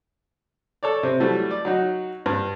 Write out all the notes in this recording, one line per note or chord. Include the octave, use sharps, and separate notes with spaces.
A4 C#5 D5
C3 C4
E3 F#3 G3 A3
D5
F#3 D#4 F#4
G2